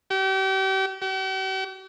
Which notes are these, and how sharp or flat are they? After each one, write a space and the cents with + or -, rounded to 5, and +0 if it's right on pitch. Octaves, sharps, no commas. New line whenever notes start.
G4 -35
G4 -45